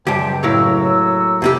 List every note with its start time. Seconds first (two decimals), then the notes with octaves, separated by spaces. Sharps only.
0.07 C#2 F#2 G3 G4 C5 G5 A5
0.43 A2 F#3 A#3 F#4 C#5 E6
1.42 F2 C3 G4